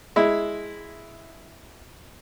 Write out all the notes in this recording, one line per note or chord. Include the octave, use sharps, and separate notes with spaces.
G#3 E4